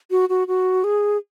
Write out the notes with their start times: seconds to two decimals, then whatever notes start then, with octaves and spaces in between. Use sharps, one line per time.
0.11 F#4
0.29 F#4
0.47 F#4
0.84 G#4